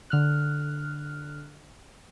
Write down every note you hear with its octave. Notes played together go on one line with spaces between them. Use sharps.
D3 F6 F#6